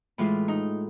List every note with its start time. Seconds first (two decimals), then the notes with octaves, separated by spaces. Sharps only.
0.18 A2 E3 G#3 F4
0.48 D#4